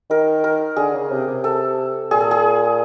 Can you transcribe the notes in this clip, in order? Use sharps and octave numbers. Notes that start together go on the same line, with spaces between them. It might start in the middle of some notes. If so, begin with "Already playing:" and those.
D#3 A#4
A#4
D3 G#4
C#3
C3
C3
A4
A#2 G#4
A4
G#4